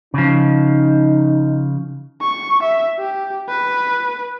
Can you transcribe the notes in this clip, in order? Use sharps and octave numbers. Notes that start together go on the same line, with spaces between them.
C#3 F3 D#4
C#6
E5
G4
B4